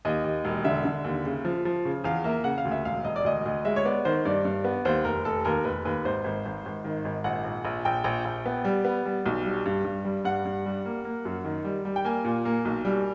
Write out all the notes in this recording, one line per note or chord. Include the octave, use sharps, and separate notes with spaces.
D#2 D#5
D#2
E1
D3 E5
D3
D#2
C#3
F3
F3
C#3
E2 F5
A#3 E5
C#3 F#5
F5
D2
E5
E1 F5
E1 D#5
D5
D2 D#5
D2
G#3 E5
C#5
B3 D5
D#3 C5
G2 D5
G2
B3
D#2 C5
F1 A#4
F1 A4
D#2 A#4
F1 B4
D#2 B4
G#1 C5
G#1
G#1
G#1
D#3
G#1
A#1 F#5
A#1
A#1
A#1 G5
A#1
A#1
B3
G3
B3
G3
B1
G3
G2
G2
G3
G2 F#5
G2
G3
A#3
A#3
F#2
D#3
G3
G3
G5
A#3 G#5
A#2
A#3
B1
G3